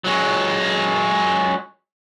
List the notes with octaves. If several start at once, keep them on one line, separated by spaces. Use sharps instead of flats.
F#3 G#3